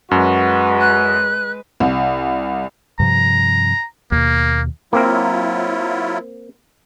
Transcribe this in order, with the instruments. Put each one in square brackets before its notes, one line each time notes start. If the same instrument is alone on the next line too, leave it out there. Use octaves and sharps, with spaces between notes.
[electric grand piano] F#2 [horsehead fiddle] G#3 B4 [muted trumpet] F#4
[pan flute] F#6
[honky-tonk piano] C2
[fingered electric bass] G2 C3 F3 [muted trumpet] A#5
[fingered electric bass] D#2 B2 [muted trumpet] A#3
[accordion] F#3 E4 F4 [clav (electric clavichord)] A#3 C4 A#4